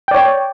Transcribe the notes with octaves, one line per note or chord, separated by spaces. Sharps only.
C#5 D5 G5